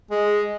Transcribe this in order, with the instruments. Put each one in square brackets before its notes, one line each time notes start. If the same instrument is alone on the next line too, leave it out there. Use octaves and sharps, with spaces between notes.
[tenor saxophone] G#3